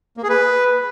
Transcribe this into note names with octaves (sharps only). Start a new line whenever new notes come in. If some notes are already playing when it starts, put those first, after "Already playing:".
A#3
G#4
B4